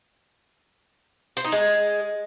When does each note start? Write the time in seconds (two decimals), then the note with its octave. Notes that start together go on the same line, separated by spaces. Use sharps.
1.37 C5
1.45 D#4
1.52 G#3